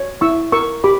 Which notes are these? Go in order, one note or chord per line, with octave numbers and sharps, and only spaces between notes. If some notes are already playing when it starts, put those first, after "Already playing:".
Already playing: C#5
E4 C#6 E6
A#4 C#6 E6
G4 B5 D6